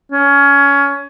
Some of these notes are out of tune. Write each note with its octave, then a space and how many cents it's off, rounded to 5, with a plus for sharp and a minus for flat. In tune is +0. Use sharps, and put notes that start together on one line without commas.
C#4 +20